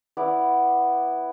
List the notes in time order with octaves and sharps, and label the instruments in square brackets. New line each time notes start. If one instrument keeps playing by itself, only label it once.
[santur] B3 E4 D5